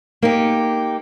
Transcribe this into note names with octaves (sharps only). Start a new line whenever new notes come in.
A#3 D#4 G4